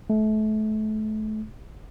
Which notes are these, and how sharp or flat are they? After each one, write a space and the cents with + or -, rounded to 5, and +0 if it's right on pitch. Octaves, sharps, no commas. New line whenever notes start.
A3 -30